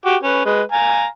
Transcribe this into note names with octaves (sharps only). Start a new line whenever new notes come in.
F#4 G4 D6
C#4 B4
G#3 B4
F5 G#5 A#5